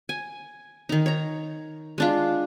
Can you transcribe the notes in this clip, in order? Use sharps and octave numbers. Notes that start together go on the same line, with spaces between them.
G#5
D#3 D#4
C#5 A#5
G#3 D4 F4